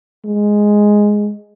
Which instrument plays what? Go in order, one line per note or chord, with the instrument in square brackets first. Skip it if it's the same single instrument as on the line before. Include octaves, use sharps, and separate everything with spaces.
[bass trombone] G#3